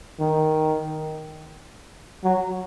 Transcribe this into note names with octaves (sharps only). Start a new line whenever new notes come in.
D#3
F#3